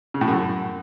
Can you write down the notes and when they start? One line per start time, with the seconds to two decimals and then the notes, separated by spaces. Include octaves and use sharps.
0.14 C#3
0.21 A2
0.28 F#2